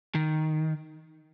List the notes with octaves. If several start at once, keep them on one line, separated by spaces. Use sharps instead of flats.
D#3